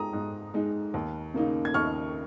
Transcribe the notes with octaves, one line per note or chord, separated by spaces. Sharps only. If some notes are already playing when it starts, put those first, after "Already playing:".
Already playing: G#3 D#4 A#5 D#6
G#2
G#3 D#4
D#2
C#3 A#3 D#4
G#6
D#2 C#6 F6